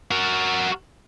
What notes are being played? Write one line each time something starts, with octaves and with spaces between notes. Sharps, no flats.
F#4 A#4